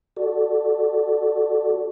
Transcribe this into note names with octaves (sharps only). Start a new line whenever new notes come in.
F#4 A4 D5